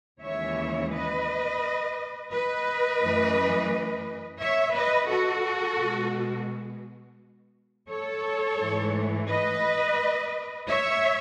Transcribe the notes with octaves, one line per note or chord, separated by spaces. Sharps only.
D#2 C#3 E3 G#3 C#5 E5
B4 D#5
B4 D#5
F#2 E3 A3
C#5 E5
B4 D#5
F#4 A4
B2 G#3
A4 C#5
G#2 E3 A3
B4 D#5
C#5 E5